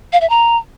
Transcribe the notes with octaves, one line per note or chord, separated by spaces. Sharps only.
F5
E5
A#5